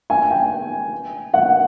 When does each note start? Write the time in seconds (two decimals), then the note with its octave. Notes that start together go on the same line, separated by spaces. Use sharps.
0.10 G#5
0.31 G5
1.34 F#5